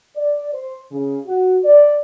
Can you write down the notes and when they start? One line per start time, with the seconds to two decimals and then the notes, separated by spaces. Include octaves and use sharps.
0.16 D5
0.53 C5
0.91 C#3
1.25 F#4
1.64 D5